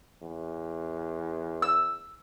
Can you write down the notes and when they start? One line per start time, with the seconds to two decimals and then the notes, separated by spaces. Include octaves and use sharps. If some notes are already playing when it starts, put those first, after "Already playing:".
0.22 E2
1.62 E6